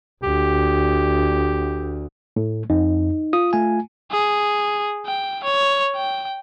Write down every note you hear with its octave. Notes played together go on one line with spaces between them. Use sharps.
D2 G4
A2 A3
F2 D#4
F4 D#6
A3 G#5
G#4
G5
C#5
G5